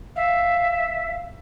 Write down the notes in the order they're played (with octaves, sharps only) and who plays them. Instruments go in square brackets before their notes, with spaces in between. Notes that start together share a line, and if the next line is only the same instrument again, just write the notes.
[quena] E5 [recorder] F5